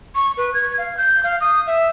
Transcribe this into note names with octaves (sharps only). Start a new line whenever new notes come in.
C#6
B4
G#6
F5
G6
F5
D#6
E5